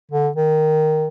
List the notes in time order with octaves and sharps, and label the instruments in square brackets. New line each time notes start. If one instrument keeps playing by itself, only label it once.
[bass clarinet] D3
D#3